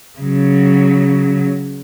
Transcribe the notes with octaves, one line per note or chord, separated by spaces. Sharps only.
C#3 F#3